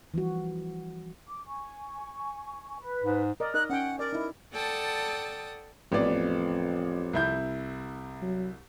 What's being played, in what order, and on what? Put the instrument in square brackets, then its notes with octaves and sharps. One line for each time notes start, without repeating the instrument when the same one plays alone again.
[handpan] E3 F3 G3 F#4
[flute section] D6
G#5 C#6
B4
[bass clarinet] G#2
[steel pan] A#4 D5 D#5
[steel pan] D#4 A#4 D#5 [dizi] F#6
[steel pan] C#4 G5 [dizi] F#5
[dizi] A#4 [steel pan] D5
[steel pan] D#4 E4
[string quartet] A4 D5 F#5 G5 A5 D#6
[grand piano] A1 B3 D5 [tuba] F2
[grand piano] C2 E4 G6
[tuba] F#3